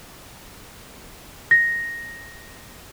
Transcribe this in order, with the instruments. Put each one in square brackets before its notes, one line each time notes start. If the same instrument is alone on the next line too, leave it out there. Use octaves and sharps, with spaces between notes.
[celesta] A#6